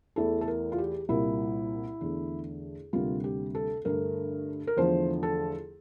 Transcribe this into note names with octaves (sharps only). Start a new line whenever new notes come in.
E2 E3 A3 A4
A4
A#4
F4
G4
C2 A#2 G3 A#3 E4
E2 D3 A3
D2 C3 G3 A#3 F4
G4
A4
G2 D3 A3 A#4
A#4
E2 D3 F3 A3 C5
A4